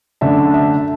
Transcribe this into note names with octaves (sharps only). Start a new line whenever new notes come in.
F#2 D3 A3 D4 E5 A5
E5 A5